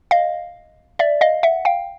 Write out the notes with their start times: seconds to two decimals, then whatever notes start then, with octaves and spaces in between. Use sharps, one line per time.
0.11 D#5 F5
0.99 D5 E5
1.21 D#5 F5
1.43 E5 F#5
1.65 F5 G5